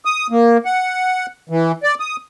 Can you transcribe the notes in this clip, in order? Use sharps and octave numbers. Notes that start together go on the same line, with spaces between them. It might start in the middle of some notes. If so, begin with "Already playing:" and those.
D#6
A#3
F#5
E3
D5
D#6